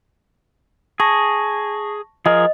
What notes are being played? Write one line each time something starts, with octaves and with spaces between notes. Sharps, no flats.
G#4 A5 C#6 A#6
F3 G#4 A#4 D#5